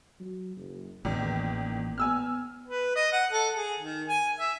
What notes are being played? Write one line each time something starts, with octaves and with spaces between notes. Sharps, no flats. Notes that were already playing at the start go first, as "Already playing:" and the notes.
F#3
F#1
A1 E2 D#3 A#3
B3 G#5 E6 F6
B4
D#5
F#5
A4
G#4
D#3
G#5
E5